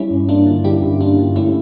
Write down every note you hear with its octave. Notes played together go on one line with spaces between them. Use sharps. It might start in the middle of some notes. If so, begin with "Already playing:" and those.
Already playing: G3 C#4 E4
G2
A#3 D4 F4
D3
G3 E4 G4
G2
A#3 D4 F4
D3
A3 C#4 E4